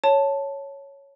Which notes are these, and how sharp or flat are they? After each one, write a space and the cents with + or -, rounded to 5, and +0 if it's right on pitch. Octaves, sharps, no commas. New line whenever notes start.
C#5 +0 A5 +0